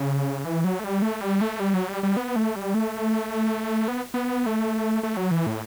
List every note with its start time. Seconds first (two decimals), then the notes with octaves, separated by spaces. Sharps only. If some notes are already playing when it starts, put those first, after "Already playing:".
Already playing: C#3
0.45 E3
0.64 F#3
0.79 A3
0.84 G3
1.02 A3
1.21 G3
1.41 A3
1.60 G3
1.74 F#3
1.88 G3
2.03 G3
2.17 B3
2.36 A3
2.56 G3
2.74 A3
3.88 B3
4.14 B3
4.46 A3
5.03 A3
5.17 F#3
5.31 E3
5.47 A2